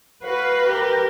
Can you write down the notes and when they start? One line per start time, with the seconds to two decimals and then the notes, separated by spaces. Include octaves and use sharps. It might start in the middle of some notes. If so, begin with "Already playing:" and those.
0.24 F#4 B4 F5
0.66 G4 A#4